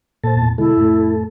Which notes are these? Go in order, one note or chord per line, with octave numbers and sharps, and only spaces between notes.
A#2 A4 C5 A5
E2 A2
B2 D3 G#3 E4 A4
F2 A2 A3